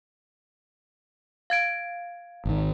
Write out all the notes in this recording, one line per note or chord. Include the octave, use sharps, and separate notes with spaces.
F5 G#6 D7
G#1 D#3